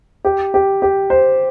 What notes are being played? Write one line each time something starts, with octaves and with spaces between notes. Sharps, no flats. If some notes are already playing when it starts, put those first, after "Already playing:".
G4
G4
G4
C5